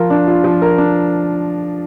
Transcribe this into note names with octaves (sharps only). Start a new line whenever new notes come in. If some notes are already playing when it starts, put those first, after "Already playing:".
Already playing: F3 F4 A#4
D4
F4
F3
A#4
D4